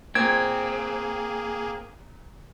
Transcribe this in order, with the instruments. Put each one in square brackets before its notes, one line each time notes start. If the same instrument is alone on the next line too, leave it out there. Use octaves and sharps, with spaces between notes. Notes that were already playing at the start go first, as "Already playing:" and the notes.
[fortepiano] A#2 [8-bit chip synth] A#3 G#4 [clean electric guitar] C4 [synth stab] G#6